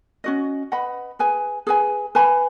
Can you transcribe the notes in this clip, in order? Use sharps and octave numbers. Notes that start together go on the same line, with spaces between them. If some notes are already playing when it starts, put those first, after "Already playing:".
C#4 F#4 D#5
B4 D#5 F#5 B5
G#4 B4 G#5
G#4 B4 G#5
B4 G#5 B5